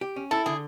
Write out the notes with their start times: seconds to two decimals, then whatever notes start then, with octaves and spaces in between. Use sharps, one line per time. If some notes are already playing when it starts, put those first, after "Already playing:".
0.01 G4
0.16 C#4
0.31 E4 A4
0.46 D3 G#4